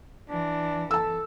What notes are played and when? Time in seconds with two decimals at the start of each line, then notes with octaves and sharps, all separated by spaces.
0.30 E3 D4
0.91 A4 A5 E6